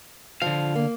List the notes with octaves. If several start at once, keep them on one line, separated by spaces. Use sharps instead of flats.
D3 F3 F5
A#3